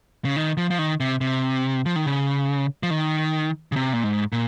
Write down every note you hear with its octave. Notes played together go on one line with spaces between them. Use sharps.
C#3
D#3
F3
F3
D#3
C3
C3
F3
D#3
C#3
F3
D#3
C#3
C3
A#2
G#2
A#2